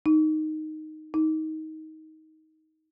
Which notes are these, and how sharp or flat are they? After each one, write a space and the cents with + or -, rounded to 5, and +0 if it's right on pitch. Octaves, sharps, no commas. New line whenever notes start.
D#4 +0
D#4 +15